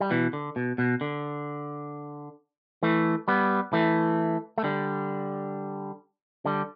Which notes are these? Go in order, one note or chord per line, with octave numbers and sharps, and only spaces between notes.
G3
B2 E3
D3
B2
B2
D3
E3 A3
G3 B3
E3 A3
A3
D3 G3
D3 G3